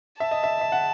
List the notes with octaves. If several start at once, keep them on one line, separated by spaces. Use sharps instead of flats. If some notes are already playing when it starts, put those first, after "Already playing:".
E5 A5
D#5
E5
E5
F#5